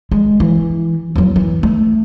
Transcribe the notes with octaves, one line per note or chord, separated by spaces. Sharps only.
G#3
E3
E2 F#3
E3
A3